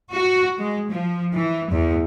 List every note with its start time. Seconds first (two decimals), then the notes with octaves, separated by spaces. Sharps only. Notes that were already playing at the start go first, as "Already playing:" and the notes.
0.12 F#4
0.58 G#3
0.90 F3
1.35 E3
1.71 E2